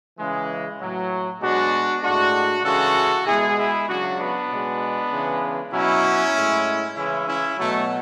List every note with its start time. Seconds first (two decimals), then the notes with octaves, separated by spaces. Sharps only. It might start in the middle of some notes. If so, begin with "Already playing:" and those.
0.19 C#3 E3 G#3
0.80 A2 F#3
1.41 B2 G#3 D4 F#4
2.03 A2 G#3 D4 F#4
2.64 C#3 E3 G#3 F#4 A4
3.26 B2 G#3 E4 G#4
3.57 E4 G#4
3.88 C#3 F#3 D4 F#4
4.18 B3 D4
4.50 B2 G#3
5.11 C#3 E3 G#3
5.72 B2 F#3 C#4 E4
6.34 A2 G#3
6.95 C#3 E3 G#3 C#4 E4
7.26 C#4 E4
7.57 B2 F#3 A3